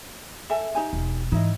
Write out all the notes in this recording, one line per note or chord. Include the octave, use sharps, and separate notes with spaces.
A4 E5 G#5
D#4 G4 G#5
E1
G#2 E3 D#4 E4 D#5